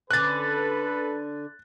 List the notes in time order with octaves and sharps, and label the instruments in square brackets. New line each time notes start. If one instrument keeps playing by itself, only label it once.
[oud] D3 C#4 [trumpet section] A4 B4 [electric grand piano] F#6 A6